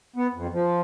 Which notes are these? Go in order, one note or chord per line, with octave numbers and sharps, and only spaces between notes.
B3
F2
F3